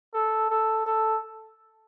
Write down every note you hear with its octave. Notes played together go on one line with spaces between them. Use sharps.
A4
A4
A4